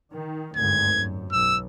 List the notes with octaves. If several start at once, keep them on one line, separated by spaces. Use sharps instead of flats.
D#3
G#1 D2 G2 G#6
F#2
B1 E6